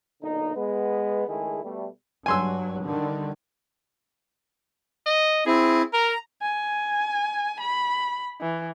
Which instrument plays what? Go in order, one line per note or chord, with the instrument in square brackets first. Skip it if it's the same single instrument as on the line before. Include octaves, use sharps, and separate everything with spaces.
[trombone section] B1 A#2 D3 D#4
G#3 B3 B4
C#2 D#3 G#3 A3 E4 G#4
B2 G3 A3
[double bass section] G2 F#3 [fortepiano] G#5 C6 E6
[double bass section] D3 D#3 G3
[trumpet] D#5
[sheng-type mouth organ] C4 E4 [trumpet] G#4
[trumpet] A#4 [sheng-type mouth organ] A#5
[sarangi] G#5
B5
E3